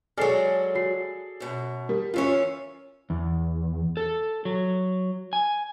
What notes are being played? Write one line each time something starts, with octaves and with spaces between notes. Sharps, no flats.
F#3 G#3 G#4 A4 D5 F6 C7
F#4 C7
F#2 B2
G3 A#4
E2 E3 C#4 F4 C#5
E2
A4
F#3
G#5